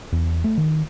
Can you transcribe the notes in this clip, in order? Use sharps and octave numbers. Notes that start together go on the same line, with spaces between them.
E2
A3
D#3